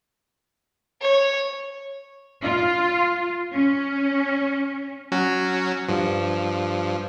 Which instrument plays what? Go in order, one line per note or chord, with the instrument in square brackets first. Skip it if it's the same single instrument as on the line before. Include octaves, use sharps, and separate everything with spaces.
[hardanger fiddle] C#5
[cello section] F4
C#4
[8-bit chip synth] F#3 C#4 F#4
G2 F3